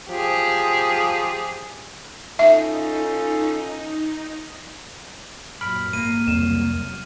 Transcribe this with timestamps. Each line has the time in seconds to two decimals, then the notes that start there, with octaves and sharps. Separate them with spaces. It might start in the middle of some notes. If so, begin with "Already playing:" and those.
0.10 F3 G4 G#4
2.39 C#4 D#4 F4 A4 E5
5.61 F#2 A#2 F#3 B5 F6 D7
5.93 G#1 A#3 D#7
6.28 C2 F2 C#3 F#3 E7